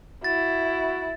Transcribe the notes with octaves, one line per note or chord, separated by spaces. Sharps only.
E4 F#4 A6